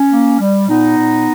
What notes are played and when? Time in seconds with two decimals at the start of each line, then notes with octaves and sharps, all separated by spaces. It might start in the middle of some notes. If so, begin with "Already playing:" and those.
Already playing: C#4
0.11 A#3
0.39 G3
0.68 A#2 B3 D#4
0.97 A#2